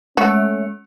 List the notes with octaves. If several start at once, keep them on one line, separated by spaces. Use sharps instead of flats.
G#3 A3 C#4 F#4 C#7